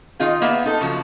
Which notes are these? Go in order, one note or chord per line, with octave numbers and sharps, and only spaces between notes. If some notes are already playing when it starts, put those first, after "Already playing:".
D#3 D#4 F4 G#4
A#3 B3 D#4 E5
D#4 A4
C#3 F3 F#3